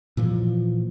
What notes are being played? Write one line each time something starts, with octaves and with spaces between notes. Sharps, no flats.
A#2 E3 F3